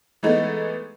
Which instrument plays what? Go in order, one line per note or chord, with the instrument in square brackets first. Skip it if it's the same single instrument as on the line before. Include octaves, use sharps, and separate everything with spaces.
[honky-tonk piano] E3 G#3 A3 B3 D#4